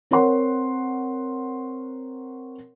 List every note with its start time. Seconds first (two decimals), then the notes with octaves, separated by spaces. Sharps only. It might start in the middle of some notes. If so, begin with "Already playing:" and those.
0.11 C4 A#4 C#5 F#5 C6